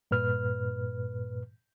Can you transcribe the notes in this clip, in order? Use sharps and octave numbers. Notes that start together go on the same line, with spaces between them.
G2 A#2 B4 F6